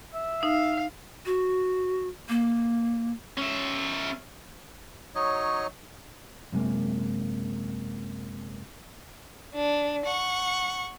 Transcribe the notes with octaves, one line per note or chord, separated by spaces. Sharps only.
E5
D#4 F5
F#4
A#3
C#4 E5
F#3 D#4 C#5 D#5
F#2 C3 F#3 G#3 A#3
D4
F#5 C#6